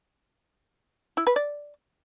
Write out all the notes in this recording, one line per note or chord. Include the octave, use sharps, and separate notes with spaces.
E4
B4
D5